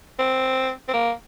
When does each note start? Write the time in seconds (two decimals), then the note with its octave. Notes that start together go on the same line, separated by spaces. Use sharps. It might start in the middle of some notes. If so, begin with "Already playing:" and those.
0.19 C4
0.88 C4
0.93 A#3